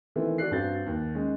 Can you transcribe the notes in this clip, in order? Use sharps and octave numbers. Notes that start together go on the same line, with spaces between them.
D#3 E3 A3 B3 C4
F#4 A4 D5 F#6 C7
G2 C4 F#4 G6 A6
D#2
G#3 C#4